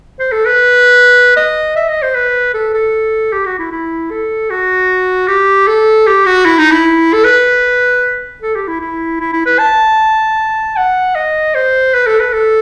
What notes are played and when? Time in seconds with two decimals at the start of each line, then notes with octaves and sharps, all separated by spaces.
0.20 C5
0.32 A4
0.46 B4
1.36 D#5
1.76 E5
1.89 D#5
2.03 C5
2.15 B4
2.54 A4
2.74 A4
3.33 G4
3.46 F#4
3.59 E4
3.71 E4
4.11 A4
4.50 F#4
5.28 G4
5.67 A4
6.07 G4
6.26 F#4
6.46 E4
6.59 D#4
6.72 E4
7.13 A4
7.24 B4
8.42 A4
8.55 G4
8.68 E4
8.81 E4
9.20 E4
9.33 E4
9.46 B4
9.59 A5
10.77 F#5
11.16 D#5
11.55 C5
11.94 B4
12.07 A4
12.20 B4
12.33 A4